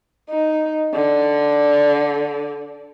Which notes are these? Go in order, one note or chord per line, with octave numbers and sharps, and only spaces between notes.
D#4
D3